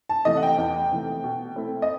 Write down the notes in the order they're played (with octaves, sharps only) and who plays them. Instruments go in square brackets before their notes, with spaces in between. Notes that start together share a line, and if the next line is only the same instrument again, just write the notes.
[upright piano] A5
C3 E3 A3 D#5
F#5
G5
E2
C3 E3 A3
B2
A3 C4 E4
D#5